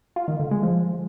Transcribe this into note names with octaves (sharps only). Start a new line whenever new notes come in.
F4
D#3
D3
G#3
F3